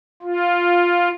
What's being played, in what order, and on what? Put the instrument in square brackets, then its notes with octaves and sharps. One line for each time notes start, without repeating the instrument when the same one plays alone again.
[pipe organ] F4